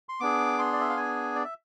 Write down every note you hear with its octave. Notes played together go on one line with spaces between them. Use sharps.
C6
B3 D4 G#4 D6
C6
D5
E5
F5
G#5
D5
E5